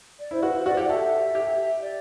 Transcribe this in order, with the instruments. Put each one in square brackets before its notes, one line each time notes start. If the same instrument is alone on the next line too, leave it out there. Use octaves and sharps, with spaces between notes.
[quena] D5
[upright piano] E4 [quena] C5
[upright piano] F#4 [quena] B4
[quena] C5
[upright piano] F#4 [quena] D5
[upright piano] G4 [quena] F#5
[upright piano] A4 [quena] E5
[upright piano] G4
[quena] D5